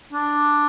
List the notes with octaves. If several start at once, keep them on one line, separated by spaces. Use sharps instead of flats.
D4